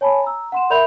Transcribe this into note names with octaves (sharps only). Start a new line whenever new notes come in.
C#5 G#5 A5 B5
A#5 E6
F#5 C6 E7
A#4 D5 E5 B5 G6 F7